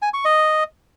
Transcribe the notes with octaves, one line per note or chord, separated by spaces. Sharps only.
G#5
C#6
D#5